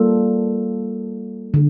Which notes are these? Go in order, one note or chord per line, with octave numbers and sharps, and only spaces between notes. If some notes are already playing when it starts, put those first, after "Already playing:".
Already playing: G3 A#3 F4 A4
D3